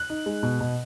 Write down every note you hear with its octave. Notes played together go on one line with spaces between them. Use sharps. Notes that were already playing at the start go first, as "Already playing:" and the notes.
Already playing: F#6
D#4
G#3
B2
B2